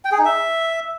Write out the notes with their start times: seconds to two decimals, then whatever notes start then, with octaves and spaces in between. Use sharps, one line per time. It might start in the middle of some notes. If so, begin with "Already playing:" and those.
0.05 G5
0.12 G#4
0.18 D#4
0.25 E5